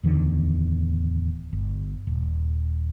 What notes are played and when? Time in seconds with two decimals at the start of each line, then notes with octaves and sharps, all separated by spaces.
0.03 D1 E2 D3 D#3
1.53 G1
2.07 D#1